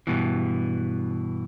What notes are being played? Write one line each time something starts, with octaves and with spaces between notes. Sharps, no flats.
G2 B2 E3